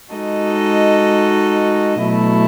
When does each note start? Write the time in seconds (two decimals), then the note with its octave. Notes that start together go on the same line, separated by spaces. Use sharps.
0.12 G#3 D#4 F#4 A4 D#5
2.05 B2 F#3 A3 E4